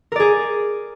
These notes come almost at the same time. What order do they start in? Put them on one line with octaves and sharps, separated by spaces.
A#4 D5 G#4